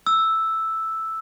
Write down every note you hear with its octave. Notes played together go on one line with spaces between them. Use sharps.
E6